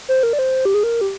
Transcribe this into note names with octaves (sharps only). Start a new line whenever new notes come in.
C5
A#4
D5
C5
G4
G#4
A#4
G4